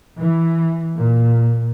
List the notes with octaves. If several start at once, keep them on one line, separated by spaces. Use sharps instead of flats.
E3
A#2